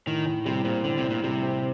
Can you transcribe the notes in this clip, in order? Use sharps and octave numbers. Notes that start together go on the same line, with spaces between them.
A2 D#3
A2
C3 G3
A#2 C4
A2 D3
C3
A2
A#2
C3 G3
C4